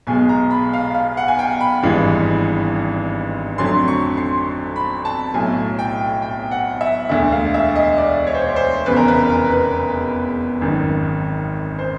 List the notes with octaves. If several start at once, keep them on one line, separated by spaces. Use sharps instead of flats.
B1 B2 G#3 G#5
A#5
B5
F5
F5
F#5
G#5
G5
B5
G#1 G2 E3 G#3
F2 D3 F#3 A3 C6
C#6
C6
B5
A5
B1 A2 F#3 A3 G#5
G5
G5
F#5
E5
E1 D2 D3 E5
F5
E5
D#5
D5
C#5
C5
C#5
C5
F1 E2 C#3 B4
A#4
B4
A#4
B4
G#1 F#2 D#3
C5